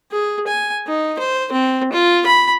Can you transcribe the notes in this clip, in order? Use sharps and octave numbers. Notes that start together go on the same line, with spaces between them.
G#4
G#5
D#4
C5
C4
F4
B5